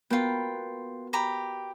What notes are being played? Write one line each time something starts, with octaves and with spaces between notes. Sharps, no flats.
B3 F4 F#4 A#4 G5
G4 A#5 B5